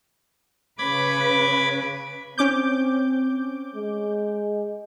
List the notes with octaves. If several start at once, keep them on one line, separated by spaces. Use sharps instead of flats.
C#3 B4 B5 D6 G#6
C4 C#4 D6 G6
G#3